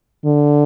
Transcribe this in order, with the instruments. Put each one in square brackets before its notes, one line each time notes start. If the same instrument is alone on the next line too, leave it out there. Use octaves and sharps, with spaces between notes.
[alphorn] D3